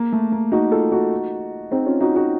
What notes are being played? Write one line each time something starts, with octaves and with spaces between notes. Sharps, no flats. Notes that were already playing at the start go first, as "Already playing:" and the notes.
Already playing: A#3
A3
A#3
D#4 F#4
F4 A4
D#4 F#4
C4 D#4
C#4 F4
D#4 F#4
D#4 F#4